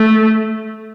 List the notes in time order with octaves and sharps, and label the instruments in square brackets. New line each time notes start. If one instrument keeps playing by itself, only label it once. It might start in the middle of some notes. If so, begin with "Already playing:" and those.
Already playing: [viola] A3